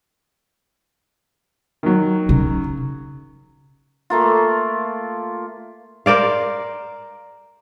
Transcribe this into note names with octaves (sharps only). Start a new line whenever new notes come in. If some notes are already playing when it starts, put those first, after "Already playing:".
D#3 F#3
C#3
A3 A#3 F4
A#4 C5 D5 F5